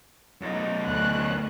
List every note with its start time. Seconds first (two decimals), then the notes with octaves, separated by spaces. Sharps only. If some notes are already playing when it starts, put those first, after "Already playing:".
0.41 F#2 D#4
0.86 D2 C#4 F#6